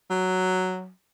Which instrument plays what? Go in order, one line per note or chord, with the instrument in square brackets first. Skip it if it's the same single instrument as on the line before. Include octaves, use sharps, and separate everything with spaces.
[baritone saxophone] F#3